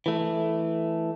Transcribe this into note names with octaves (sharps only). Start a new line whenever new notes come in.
E3 A3